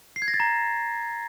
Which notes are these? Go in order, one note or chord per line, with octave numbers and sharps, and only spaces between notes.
C7
G#6
A#6
A6
A#5